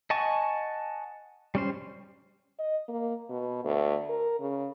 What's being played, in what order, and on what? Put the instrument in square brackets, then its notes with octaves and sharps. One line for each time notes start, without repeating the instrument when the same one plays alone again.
[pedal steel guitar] D#5 F#5 G#5 A5 C#6
G3 C#4 C5
[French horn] D#5
A#3
B2
D2
A#4
C#3